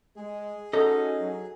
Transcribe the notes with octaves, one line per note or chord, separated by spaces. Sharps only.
G#3 G#4
C#4 D#4 F#4 A4 D#5
F#3